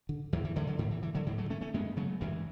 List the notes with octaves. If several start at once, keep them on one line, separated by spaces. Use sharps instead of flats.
D3
E2 E3
E3
D3 E3 G#3
D3 F#3
G#2 E3
E3
E3
D3 F#3
G#2 E3 G#3
F#3 A3
A3 C#4
A3 C#4
F#2 G#3 B3
C#3 F#3 A3
F#2 E3 G#3